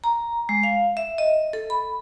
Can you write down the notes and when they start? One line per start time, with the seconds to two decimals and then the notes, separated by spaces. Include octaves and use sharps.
0.04 A#5
0.49 G#3
0.63 F5
0.97 E5
1.18 D#5
1.53 A4
1.70 B5